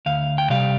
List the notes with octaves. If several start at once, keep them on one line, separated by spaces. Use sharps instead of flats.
D2 F5
G5
C3 G3 F5